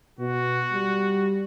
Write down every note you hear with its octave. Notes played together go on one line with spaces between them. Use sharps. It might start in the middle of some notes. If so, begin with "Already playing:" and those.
B2 F#4
G3